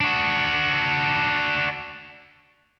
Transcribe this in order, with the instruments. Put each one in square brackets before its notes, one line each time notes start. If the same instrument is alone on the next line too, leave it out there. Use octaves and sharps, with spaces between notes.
[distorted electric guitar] D4 F#4